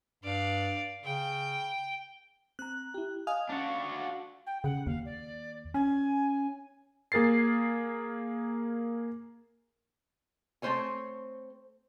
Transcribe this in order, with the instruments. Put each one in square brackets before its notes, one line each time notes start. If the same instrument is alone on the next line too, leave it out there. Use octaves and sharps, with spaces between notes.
[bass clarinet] G2 [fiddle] D5 F5
[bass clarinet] C#3 [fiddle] G5
[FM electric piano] C4 A#5 [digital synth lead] F#6
[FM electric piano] E4 G4
[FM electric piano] D#5 G#5 D#6 [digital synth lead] F5
[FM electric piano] C#4 C#7 [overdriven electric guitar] D4 F#4
[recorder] G5
[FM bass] C#3 [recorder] F#5
[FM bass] D#2 [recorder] F5
[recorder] D5
[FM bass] C#4 [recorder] G#5
[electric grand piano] A#3 G#4 A#4 A6 C7
[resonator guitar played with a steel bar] A3 C4 E4 C5 C#5 G#5